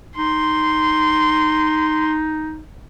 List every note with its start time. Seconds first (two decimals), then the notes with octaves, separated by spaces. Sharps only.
0.16 D#4 C6